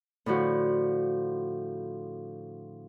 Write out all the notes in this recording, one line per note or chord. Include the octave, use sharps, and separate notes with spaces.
A2 D3 F3 F#4